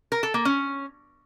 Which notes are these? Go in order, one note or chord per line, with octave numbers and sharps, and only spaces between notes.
A#4
A4
A#3
C#4